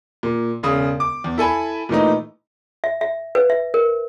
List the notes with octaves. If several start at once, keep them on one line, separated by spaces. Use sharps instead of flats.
A#2
E1 C#3 D#6
D6
E2
E4 A4 G#5 B5
A#2 E3 A3 D#4
E5
E5
B4
E5
A#4